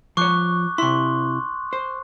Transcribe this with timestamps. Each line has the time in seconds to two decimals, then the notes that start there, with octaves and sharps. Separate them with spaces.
0.17 F3 C#5 C#6 D6 F#6
0.78 C3 E4 C6 C#6
1.73 C5